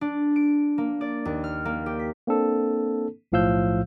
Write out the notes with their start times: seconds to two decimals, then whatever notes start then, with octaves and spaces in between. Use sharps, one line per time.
0.01 D4
0.36 D7
0.78 A#3
1.01 D5
1.25 D#2
1.44 F6
1.65 A#3
1.86 G4
1.99 B6
2.27 A#3 C4 D4 A4
3.32 B1 A2 F3 F5 E6 G6